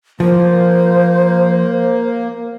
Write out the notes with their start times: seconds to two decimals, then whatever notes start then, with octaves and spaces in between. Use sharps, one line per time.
0.20 F3 A#3 C5